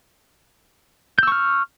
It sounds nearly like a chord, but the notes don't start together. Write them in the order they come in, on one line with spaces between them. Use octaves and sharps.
G6 E6 C#6 F6